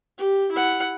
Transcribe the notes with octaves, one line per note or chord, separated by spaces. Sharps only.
G4
E4 F#5